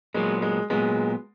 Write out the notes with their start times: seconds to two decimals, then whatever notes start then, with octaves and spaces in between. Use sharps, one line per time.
0.14 A#2 F#3 G#3 B3
0.42 G#3
0.70 A#2 F#3 G#3 B3